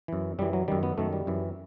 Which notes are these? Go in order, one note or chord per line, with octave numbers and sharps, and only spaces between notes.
F#2 E3
F#2 E3 G3
F#3
F#2 D#3 G3
B3
F#2 D#3 A3
G3
F#2 E3